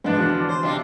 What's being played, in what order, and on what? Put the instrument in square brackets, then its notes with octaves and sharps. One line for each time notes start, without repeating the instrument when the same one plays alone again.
[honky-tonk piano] G#2 B3 [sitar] F3 D4
[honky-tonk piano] E2 B2 D3
[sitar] C5
C3 D4 F4